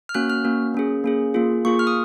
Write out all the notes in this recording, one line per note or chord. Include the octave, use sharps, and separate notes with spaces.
F6
A#3 C#4 F#4 F#6
F6
A#3 C#4 F#4
A#3 C#4 G#4
A#3 C#4 G#4
A#3 F4 G#4
A#3 F4 G#4 C#6
F6
D#6